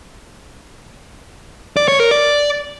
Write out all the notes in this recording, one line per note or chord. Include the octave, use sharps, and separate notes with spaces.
D5
C#5
A#4
D5